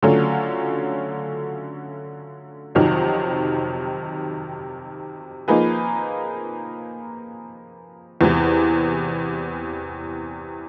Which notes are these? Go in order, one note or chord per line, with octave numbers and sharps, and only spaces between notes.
D3 F#3 A3 C#4 F4
F2 C3 D#3 F#3
F3 A#3 D#4 G#4 B4
E2 C3 E3